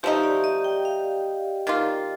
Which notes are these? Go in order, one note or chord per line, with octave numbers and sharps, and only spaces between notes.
F3 A3 D#4 G4
D5
D#5
G5
F5
D#3 A#3 F4